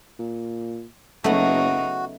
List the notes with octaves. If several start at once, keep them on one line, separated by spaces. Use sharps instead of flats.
A#2
F#1 C#3 F#3 A3 B3 D#4 F#4